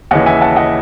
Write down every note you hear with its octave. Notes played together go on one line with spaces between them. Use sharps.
D#2 C#3 E3 D#5 F#5
E5 G#5
F#5 A5
D#5 F#5